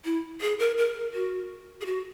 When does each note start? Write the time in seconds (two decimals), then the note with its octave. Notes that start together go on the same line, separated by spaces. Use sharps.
0.05 E4
0.41 G#4
0.59 A#4
0.78 A#4
1.14 F#4
1.81 G#4
1.86 F#4